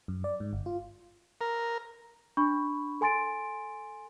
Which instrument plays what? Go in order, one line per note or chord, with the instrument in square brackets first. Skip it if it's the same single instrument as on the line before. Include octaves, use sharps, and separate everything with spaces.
[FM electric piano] F#2
D5
G#2
G1
F4
[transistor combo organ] A#4
[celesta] D4 B5 C#6
A4 G#5 C6 A6 D7